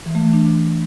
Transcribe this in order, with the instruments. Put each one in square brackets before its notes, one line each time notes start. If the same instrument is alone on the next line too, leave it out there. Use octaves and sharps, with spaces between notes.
[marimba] E3
A3
E3
D4